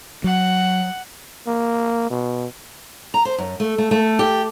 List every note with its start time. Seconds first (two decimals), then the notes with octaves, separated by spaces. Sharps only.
0.24 F#3 F#5
1.47 A#3
2.10 B2
3.14 A#5
3.25 C5
3.38 F#2
3.60 A3
3.78 A3
3.91 A3
4.19 G4